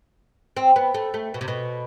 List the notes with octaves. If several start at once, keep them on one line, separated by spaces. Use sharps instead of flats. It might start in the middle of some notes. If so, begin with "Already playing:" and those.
C4
B3
A3
A3
B2
C3
B2